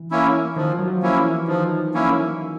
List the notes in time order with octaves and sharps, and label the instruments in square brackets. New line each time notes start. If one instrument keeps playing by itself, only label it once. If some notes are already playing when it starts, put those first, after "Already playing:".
Already playing: [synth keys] E3
[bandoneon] A#3 C#4 E4
[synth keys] D#3 [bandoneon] F3
[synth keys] F#3
F3
[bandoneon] A#3 C#4 E4
[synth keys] E3
[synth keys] D#3 [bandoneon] F3
[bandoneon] A#3 C#4 E4